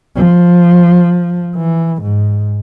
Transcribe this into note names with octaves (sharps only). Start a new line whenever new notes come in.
F3
E3
G#2